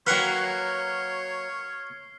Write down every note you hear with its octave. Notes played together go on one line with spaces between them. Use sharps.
F#3 A#3 B4 C#5 F#5 G5 F6 C7